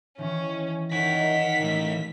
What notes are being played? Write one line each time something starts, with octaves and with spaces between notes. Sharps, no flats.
D#3 E3 C#4
D#3 C#5 F#5 G#5 B6
E3 A3